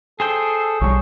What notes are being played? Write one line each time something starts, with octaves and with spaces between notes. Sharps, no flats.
G#4 A4 C5 G5
B1 D#3 G3 C#5